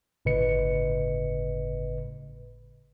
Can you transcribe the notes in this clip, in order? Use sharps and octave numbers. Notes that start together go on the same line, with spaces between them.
G1 A2 C#3 B4 D#5 C#7